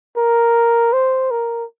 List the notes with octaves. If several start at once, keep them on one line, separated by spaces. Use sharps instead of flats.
A#4
C5
A#4